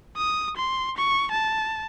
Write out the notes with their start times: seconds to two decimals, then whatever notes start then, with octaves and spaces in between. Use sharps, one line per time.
0.17 D#6
0.57 C6
0.97 C#6
1.31 A5